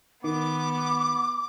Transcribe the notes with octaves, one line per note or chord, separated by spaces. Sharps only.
D#3 B3 D6